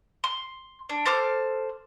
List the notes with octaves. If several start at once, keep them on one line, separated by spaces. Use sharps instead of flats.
C6
D4
A4 C5 D6 F6